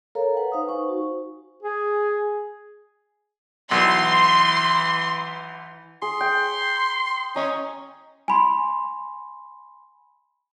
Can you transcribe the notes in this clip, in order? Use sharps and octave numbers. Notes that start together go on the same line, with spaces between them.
A4 A#4 C#5 F5 A#5
B4 F#5 G#5
D#4 C5 F5 F#5 G#5 D#6
D#4 C5 C#6
F#4
G#4
B1 E3 C6
G#4 C6
G5
C#4 C#5 D#5 A#5
G#5 B5 C6